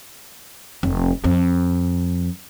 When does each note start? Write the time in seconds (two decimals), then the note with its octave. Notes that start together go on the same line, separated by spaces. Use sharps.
0.83 F1
1.24 F2